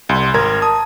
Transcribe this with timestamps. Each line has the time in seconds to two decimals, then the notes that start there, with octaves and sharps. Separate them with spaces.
0.09 C2 C6
0.34 G#1 A#4 A#5 G#6
0.62 A5 D#6